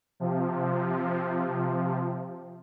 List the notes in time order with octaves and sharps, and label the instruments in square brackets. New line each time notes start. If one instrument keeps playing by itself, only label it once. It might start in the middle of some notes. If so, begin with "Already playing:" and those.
[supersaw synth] C3 F3